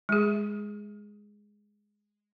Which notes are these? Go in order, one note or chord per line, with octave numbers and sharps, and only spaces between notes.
G#3 G#4